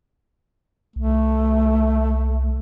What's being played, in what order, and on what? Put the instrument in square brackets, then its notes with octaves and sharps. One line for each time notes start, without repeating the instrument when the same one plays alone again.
[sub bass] C2 [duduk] A3